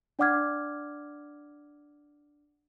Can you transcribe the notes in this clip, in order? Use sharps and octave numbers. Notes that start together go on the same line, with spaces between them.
D4 D5 F#5 D6 F6 G#6